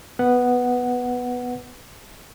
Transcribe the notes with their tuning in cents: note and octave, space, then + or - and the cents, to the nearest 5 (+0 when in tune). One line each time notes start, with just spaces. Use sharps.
B3 +0 B4 +0 F#5 +0